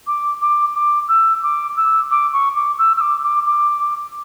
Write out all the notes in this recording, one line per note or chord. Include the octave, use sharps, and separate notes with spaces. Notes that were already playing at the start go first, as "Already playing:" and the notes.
D6
D6
D6
E6
D6
E6
D6
C#6
D6
E6
E6
D6
D6
D6